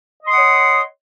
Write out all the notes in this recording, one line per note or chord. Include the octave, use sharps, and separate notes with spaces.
C#5 D#5 F#5 C6 D#6